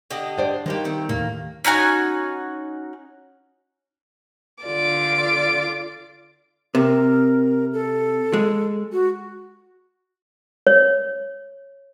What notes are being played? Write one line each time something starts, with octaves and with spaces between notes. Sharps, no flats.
D3 G4 D#5
D4 C5 D5
D#3 G3 G#3 A#3 G4
A3 C4
D#2 A2 A#3
C#4 D#4 F#4 G#5
D3 F4 D5 D6
C3 A#4
A4
G#3
F#4
C#5